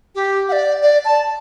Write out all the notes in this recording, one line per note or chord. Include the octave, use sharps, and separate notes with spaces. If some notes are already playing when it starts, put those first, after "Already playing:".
G4
F#5
D5
D5
A5